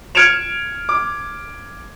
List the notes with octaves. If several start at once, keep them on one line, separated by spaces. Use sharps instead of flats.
F6 G#6 C#7 D7 E7 F7
D6